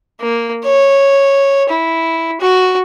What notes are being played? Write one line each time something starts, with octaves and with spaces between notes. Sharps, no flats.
A#3
C#5
E4
F#4